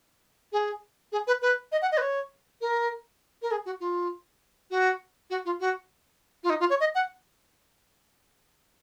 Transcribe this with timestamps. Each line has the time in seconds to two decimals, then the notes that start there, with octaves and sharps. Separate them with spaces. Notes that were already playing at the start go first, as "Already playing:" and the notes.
0.52 G#4
1.12 G#4
1.27 B4
1.42 B4
1.72 D#5
1.82 F#5
1.92 D#5
1.97 B4
2.02 C#5
2.61 A#4
3.42 A#4
3.51 G#4
3.66 F#4
3.80 F4
4.71 F#4
5.30 F#4
5.45 F4
5.60 F#4
6.44 F4
6.50 D#4
6.60 F4
6.70 C#5
6.80 D#5
6.95 F#5